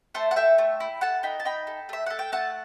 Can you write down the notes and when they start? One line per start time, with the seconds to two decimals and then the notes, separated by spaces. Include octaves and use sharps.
0.14 A3 A4 C5
0.31 F#5
0.36 A4 E5 G5
0.58 A3
0.80 E4
1.01 A4 F#5 A5
1.23 D#4 G5 B5
1.40 A5
1.45 D#4 G5 B5
1.67 A4
1.89 A3 E5
2.06 A4 F#5
2.19 G5
2.32 A3 F#5 A5